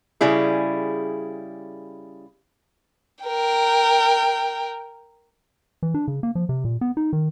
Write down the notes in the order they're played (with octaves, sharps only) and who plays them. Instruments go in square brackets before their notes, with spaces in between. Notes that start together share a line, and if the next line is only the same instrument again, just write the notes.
[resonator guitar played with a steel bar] C#3 G3 E4 G#4
[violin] A#4 G5
[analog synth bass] E3
D4
C#3
A#3
F3
C3
A#2
B3
D#4
D#3